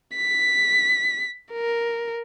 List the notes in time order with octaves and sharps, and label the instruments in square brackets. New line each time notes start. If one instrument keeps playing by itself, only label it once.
[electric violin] B6
A#4